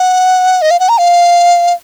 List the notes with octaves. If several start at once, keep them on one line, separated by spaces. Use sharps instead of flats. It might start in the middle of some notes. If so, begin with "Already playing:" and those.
Already playing: F#5
D#5
F5
F#5
A#5
F5